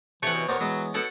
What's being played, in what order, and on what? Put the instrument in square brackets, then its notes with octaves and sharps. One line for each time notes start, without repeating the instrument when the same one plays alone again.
[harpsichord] C3 [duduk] E3 [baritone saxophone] A3 [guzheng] C#5 F#5
[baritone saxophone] B2
[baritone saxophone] G2 [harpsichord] B3 D4 A#4 [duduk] C5
[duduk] E3 [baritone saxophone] F#3 [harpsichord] G#3 B3
[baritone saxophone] B2 [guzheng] A4 F#5 A5